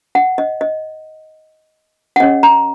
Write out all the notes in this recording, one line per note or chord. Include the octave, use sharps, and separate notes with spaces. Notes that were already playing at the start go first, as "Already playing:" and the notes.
F#5
D#5
D#5
F#5
C#4 G#4 C#5 D#5
A#5